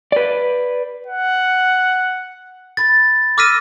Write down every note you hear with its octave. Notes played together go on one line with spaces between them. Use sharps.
B4 D5
F#5
B5 A6
D6 E6 F6 A#6 B6 D#7